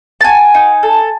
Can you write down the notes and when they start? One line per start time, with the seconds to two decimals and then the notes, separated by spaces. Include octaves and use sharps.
0.21 A5
0.24 F#4 G#5
0.55 D#4
0.83 A4